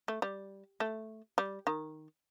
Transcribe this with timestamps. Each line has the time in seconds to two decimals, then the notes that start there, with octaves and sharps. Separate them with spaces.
0.08 A3
0.22 G3
0.80 A3
1.38 G3
1.67 D#3